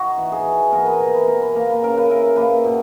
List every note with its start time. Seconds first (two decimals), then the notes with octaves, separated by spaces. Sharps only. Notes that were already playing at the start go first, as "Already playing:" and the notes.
Already playing: D#4 F#4
0.17 E3
0.32 G#4
0.45 E3
0.72 B3 A#4
0.86 B4
1.00 B2 A#4
1.14 B4
1.27 B2 A#4
1.42 B4
1.55 A#3 A#4
1.70 B4
1.82 C#3 A#4
1.97 B4
2.10 E4 A#4
2.36 A#3 B4
2.64 B2